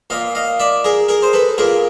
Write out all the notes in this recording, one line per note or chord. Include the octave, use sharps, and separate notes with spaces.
A#2 D#5 F5
D#5 F5
D5 E5
G#4 A#4
G#4 A#4
C5
A4 B4
A#2 G#4 A#4